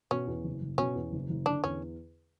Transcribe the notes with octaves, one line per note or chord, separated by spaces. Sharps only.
B2 C#4
E2
F#1
F#1
B2 C#4
E2
F#1
F#1
D3 D4
E2 C#4